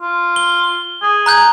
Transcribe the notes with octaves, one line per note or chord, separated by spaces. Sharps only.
F4
G7
G#4
A#5 F#6 G6